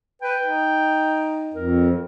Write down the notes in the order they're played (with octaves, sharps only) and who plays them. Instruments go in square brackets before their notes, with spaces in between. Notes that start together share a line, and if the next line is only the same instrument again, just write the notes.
[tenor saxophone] B4 [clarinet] G5
[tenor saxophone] D#4
[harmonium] F2 [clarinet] A#4